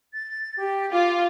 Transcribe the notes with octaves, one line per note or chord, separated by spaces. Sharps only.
A6
G4
F4 D6